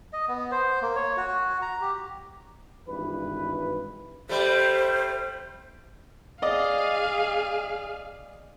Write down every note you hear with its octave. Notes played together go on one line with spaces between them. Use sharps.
D#5
B3
C5
A#3
C#5
F#4
A#5
G4
G#1 G2 E3 B4
G3 A3 C5
G#4 D5 D#5 F5